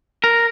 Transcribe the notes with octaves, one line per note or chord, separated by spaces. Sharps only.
A#4